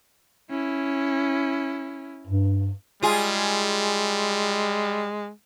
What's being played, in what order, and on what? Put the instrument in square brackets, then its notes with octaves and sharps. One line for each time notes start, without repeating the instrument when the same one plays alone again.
[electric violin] C#4 E4
[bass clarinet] G2
[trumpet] G3 [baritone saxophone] G#3 [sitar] F4 G#4